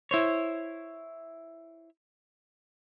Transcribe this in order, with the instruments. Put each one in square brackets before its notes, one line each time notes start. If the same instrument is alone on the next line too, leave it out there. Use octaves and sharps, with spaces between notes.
[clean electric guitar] E4 C5 C#5